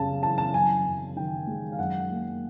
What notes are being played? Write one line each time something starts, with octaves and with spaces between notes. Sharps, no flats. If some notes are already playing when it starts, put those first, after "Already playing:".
Already playing: F#2 C#3 G3 A5
E3 A5
A5
F#2 G#5
F#2
D#3 G5
G#3
F5
F#2 F#5
A#3